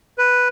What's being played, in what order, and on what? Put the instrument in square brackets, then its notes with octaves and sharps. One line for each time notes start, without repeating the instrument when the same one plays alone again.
[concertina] B4